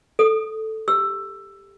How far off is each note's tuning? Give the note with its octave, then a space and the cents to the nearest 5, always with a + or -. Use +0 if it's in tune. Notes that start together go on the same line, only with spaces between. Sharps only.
A4 +0 D#6 +0
G4 +15 E6 +10